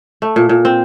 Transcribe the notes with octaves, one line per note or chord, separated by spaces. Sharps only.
A3
A#2
A#2
C4